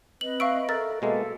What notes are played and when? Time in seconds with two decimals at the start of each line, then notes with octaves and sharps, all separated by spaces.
0.21 C4 B4 D#5 F#7
0.40 E5 F5 C#6 D7
0.69 A4 A#4 E5 A6
1.02 B2 G#3 A#3 A4 E5 F5